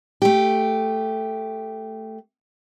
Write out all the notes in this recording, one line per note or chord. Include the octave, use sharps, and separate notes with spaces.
A3 G4